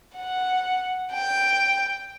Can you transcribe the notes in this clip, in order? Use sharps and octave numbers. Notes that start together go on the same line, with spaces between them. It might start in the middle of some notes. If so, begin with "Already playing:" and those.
F#5
G5